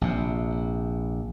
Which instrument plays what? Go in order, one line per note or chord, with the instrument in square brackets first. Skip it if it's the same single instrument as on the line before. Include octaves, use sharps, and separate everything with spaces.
[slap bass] A#1 C3